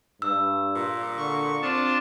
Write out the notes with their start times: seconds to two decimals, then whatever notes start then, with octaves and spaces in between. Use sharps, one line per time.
0.22 G2 E6
0.75 A#2
1.17 D3 C#6
1.62 C4 D4 F4 A5